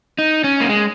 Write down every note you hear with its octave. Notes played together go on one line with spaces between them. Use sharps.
D#4
C#4
A#3
G#3